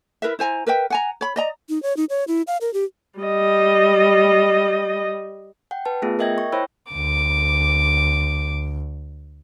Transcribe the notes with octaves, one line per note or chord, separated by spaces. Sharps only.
E4 A#4 B4 E5
E4 C5 G#5 A#5
A#4 B4 E5 G5
F#5 G#5 A#5
C#5 B5
D5 D#5 A#5
D#4
C#5
D#4
C#5
E4
F5
A#4
G4
G3 D#5
F#5 G5
B4 A5
A3 B3 F4 G#4
A#4 D#5 E5 G5 G#6 A#6
C#6
E4 C5 C#5 G5 B5 E6
D2 D6